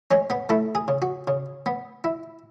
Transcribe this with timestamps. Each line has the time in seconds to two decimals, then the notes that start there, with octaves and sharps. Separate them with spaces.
0.11 G#3 C#4 C#5
0.30 B3 B4
0.49 A3 E4 A4
0.75 G#4
0.88 C#3
1.02 F#4
1.28 C#3
1.66 B3
2.04 E4